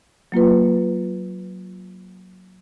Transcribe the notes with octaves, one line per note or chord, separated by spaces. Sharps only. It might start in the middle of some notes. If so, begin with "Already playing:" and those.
F#3 A#3 F4 B4